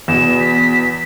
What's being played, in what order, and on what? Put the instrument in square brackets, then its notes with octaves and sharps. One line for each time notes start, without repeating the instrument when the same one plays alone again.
[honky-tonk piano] E2 B2 [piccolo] E7
[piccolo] B6